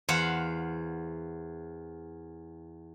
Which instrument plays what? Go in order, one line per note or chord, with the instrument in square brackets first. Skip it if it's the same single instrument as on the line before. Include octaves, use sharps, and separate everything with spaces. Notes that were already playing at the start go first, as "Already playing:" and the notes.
[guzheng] E2 C5 F5 F#5